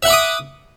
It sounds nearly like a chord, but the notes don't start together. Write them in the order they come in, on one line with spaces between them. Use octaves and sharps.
E5 F#5 B5 D6 D#6